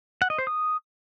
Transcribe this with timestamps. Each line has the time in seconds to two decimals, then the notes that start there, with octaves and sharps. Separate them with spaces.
0.22 F#5
0.30 D#5
0.38 C5
0.47 D#6